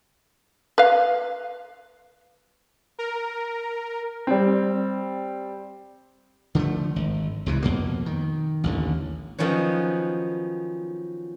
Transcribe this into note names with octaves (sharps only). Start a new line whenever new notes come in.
B4 F5
A#4
G3 C4
D3 F3 G#3 A3
G#1
C#2 C3 E3
F2 B2 A#3
D#3
A1 D#2 D3
D#3 F3 F#3 B3 C#4